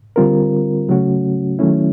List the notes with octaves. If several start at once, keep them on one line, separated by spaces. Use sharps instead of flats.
D3 G3 C4 F4 A#4
C#3 F#3 A3 C#4 F#4
D#3 F#3 A3 C#4 E4